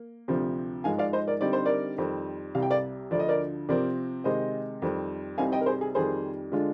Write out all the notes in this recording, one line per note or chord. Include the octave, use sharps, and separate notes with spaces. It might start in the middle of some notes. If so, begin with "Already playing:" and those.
Already playing: A#3
D2 C3 F3 C4
G#2 F3 G#3 F5 G#5
D5 F5
C5 D#5
A#4 D5
D3 G3 C4 D#4 D5
C5
A#4 D5
F2 D#3 G3 C4
C2 C3 G3 F5
G5
D5 F5
D2 D3 F3 D5
D#5
A#4 D5
C3 F3 C4 A#4 D5
C3 D#3 G#3 D#4 C5 D#5
F2 D#3 G3 C4
C2 C3 G3 C4 D#4 F5 G#5
D#5 G5
A#4
G#4 C5
G#4
F2 D#3 G3 G#4 C5
D3 G#3 D4 F4